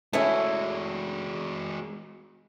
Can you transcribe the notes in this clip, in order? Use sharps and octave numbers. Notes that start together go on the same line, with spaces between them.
G#3 A3 C#4 E4 F#4